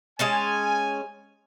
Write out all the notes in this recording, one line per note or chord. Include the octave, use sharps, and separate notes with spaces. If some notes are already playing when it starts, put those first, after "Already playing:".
G#3 C#4 G#5 A5